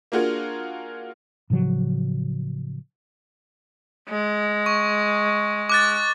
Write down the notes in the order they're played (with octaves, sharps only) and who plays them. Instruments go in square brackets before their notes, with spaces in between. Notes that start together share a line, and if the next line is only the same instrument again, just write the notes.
[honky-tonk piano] A#3 D4 F4 F#4 G#4 A#4
[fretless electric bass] A2 C#3 F3 F#3
[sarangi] G#3
[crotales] C#6
D6 F#6 A6